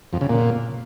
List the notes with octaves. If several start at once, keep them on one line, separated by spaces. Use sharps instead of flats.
F2
C#3
A#2